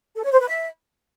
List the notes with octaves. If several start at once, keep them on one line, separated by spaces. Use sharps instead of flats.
A4
C#5
C5
B4
E5